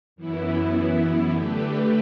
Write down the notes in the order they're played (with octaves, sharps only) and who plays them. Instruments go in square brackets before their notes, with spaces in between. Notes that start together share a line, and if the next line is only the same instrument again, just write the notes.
[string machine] F#2 E3 B3 E4
D3 A3 D4 G4 B4